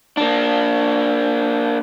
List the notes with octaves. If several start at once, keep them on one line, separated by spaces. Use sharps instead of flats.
A#3 D4